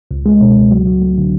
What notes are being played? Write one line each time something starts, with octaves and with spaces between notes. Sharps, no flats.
C#2
G#3
B2
C#2
F#3
F#3
A3
D3